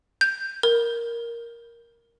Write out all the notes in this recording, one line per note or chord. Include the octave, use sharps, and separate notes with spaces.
G6
A#4